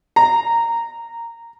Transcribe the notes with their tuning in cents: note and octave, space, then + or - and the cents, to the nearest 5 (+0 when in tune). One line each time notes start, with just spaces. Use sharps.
A#5 -10